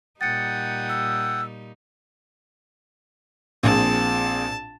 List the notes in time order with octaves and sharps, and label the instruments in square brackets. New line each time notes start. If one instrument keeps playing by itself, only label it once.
[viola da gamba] A#2 G3 D#4 [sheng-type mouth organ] F#5 G5 D#6 [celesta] A6 C#7
[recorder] E6
[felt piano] A#1 [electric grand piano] A#2 C4 G#4 [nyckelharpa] A5